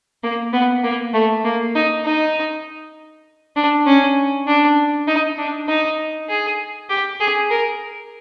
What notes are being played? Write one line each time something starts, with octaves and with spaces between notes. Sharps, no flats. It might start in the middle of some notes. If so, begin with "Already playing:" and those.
A#3
B3
A#3
A3
A#3
D#4
D#4
D4
C#4
D4
D#4
D4
D#4
G#4
G4
G#4
A#4